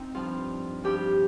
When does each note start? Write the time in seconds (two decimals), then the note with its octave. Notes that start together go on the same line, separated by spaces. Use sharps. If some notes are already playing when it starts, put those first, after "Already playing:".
Already playing: C4 D#4
0.15 G2 F3 F4
0.84 G2 F3 G4